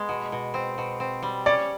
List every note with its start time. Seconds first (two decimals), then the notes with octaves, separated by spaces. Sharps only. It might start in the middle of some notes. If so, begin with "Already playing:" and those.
Already playing: G#3 B3
0.09 B2
0.32 B2
0.54 C4
0.78 B2
1.00 C4
1.22 G3
1.46 C#4 D5